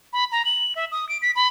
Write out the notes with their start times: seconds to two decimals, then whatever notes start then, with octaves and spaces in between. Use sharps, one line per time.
0.13 B5
0.32 A#5
0.45 F#7
0.76 E5
0.91 D#6
1.09 D7
1.22 B6
1.35 B5